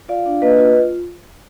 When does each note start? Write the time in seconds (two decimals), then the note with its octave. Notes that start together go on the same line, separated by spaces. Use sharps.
0.08 F4 D5 F5
0.26 D4
0.42 A#3 B4 D#5
0.58 F4